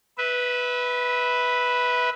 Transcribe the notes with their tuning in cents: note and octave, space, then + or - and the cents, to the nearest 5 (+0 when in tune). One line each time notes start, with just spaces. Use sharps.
B4 +0 E5 -25